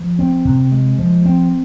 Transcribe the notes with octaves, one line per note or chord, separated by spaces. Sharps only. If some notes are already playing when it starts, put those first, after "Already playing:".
Already playing: F3
C4
C3
G#3
F3
C4